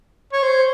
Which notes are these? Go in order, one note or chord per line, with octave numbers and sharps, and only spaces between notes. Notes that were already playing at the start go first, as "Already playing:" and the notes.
C#5
C5